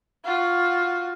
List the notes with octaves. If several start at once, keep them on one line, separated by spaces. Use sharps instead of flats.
F4 F#4